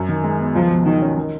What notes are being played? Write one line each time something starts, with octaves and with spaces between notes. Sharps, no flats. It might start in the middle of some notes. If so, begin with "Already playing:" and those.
Already playing: F#2
D#3
G#3
B3
C#2 F3
B2
D#3 F#3
C#4
D#3